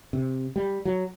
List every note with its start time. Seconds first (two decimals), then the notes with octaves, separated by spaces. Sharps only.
0.13 C3
0.56 G3
0.85 F#3